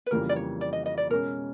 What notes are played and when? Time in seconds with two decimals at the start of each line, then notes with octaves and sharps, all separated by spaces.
0.06 B4
0.11 F2 C#3 E3 G3 A#3 A#4
0.29 D5
0.36 C#5
0.61 D5
0.73 D#5
0.86 D#5
0.98 D5
1.10 B2 G#3 C#4 A#4